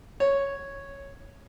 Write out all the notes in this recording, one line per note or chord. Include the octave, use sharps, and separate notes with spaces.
C#5